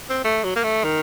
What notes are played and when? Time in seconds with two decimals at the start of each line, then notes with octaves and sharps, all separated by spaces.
0.10 C4
0.24 A3
0.44 F#3
0.56 A#3
0.63 A3
0.84 D#3